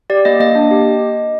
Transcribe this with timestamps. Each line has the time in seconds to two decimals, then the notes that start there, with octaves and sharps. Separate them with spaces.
0.10 G4 D5
0.25 A#3 D#5
0.40 A#3 D#5
0.55 D4
0.71 G4